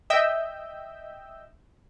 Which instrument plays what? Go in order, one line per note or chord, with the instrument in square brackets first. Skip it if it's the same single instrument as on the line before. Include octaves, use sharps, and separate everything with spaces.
[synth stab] D#5 E5 G5 E6 G6